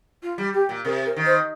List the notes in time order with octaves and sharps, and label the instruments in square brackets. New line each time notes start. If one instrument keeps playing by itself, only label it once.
[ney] F4
[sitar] G3
[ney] G4
[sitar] A#2
[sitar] C3 [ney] A#4
[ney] A#4
[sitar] D#3
[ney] C5